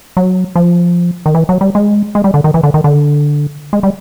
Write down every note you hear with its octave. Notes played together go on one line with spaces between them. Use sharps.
F#3
F3
D#3
E3
F#3
G3
G#3
G#3
G3
D3
D#3
E3
D3
D#3
D3
G#3
G3